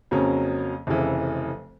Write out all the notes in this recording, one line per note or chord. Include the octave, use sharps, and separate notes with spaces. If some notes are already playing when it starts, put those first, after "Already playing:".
F2 C#3 F#3 A#3 C#4
F1 F2 C#3 E3